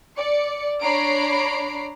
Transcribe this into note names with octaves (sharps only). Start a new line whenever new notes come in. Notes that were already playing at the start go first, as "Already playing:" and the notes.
D5 C#7
D4 C#5 A#5 B5 C7 D7